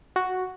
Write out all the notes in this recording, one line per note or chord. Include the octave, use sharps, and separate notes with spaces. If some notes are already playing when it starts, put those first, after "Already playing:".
F#4